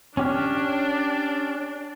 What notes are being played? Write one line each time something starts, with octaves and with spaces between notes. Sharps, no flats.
C#4 D4 G4 F6